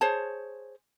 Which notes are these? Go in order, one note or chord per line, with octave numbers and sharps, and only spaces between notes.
G#4 C5 C#5 A5